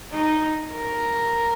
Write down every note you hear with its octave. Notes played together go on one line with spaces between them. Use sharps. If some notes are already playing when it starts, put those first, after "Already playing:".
D#4
A#4